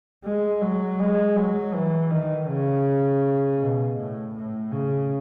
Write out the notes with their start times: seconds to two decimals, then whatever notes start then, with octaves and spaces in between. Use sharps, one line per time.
0.24 G#3
0.62 F#3
0.99 G#3
1.36 F#3
1.74 E3
2.10 D#3
2.48 C#3
3.59 B2
3.97 A2
4.35 A2
4.72 C#3